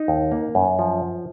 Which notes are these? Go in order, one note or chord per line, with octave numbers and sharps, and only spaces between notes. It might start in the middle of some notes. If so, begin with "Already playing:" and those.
Already playing: D#4
D#2
A#3
F#2
F3